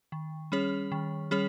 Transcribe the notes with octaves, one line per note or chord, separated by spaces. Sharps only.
D#3
G3 C#4 G#4 C#5
D#3
G3 C#4 G#4 C#5